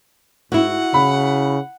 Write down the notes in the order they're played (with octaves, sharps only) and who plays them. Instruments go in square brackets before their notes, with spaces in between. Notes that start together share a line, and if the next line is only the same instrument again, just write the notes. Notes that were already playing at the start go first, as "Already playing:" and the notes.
[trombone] G#2 [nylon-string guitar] E4 F#4 [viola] F#5
[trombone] C#3 [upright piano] B5